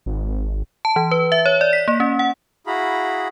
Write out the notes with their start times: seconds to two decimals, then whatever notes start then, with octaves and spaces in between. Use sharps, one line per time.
0.06 G#1
0.85 A5
0.96 E3
1.11 B4
1.32 E5
1.46 C#5
1.61 D5
1.73 B6
1.88 A#3
2.00 C#4
2.19 F#5
2.67 E4 F#4 G#4 F5 A#5 B5